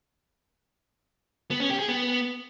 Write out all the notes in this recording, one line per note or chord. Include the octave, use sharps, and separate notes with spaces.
B3
C#4
G4
G#4
B3